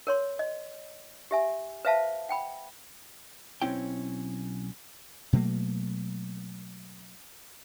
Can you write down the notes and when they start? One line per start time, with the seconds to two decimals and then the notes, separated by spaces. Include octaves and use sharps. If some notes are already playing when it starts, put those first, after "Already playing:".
0.07 A#4 C#5 C6
0.39 D#5
1.31 G4 E5 G#5
1.85 B4 C5 E5 F5 A5
2.29 F#5 G5 B5
3.62 B1 C3 C4 C#4 E4 G5
5.33 B2 F#3 A3 A#3